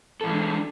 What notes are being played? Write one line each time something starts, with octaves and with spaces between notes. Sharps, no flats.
E3 G#3 A3 D4 A4